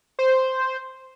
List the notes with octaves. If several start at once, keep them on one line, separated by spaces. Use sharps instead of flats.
C5